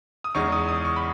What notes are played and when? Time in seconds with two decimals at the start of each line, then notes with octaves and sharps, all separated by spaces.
0.24 D#6
0.35 E2 C#3 G#3 D#4 C#6
0.52 D#6
0.68 D#6
0.85 C#6
0.96 B5